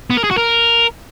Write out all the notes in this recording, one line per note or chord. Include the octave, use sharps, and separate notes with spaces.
B3
A#4
G#4
F#4
A#4